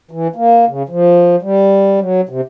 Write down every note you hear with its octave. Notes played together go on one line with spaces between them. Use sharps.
E3
A#3
C#3
F3
G3
F#3
C3